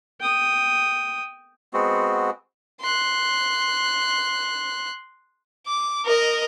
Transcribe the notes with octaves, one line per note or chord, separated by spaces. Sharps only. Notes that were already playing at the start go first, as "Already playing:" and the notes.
G5 D#6
G#3 B3 C4 F#4
C6 F#6
D6
A#4 D#5